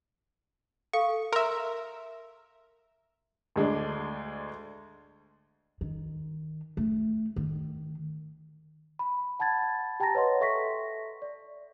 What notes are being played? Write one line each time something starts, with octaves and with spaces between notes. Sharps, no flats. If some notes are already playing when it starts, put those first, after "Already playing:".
A4 F5 C#6
A#4 E5 C6
D2 G#3 D4
D#3
A3
D#3
B5
F#5 A5 B5 G#6 A6
G4 G5 A5 A#5 A6 A#6
B4 C#5 D#5 F#5 C6
A4 E5 C#6 A#6 B6
D5